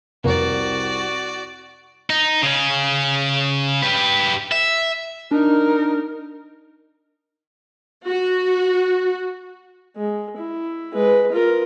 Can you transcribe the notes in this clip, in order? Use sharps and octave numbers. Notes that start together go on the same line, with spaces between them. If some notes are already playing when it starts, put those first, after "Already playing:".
C2 F2 C3 A#3 F#4 D5
D#4
C#3 C#4
G4 B4
E5
D4 D#4 A#4
F#4
G#3
E4
G#3 B4
F4 A#4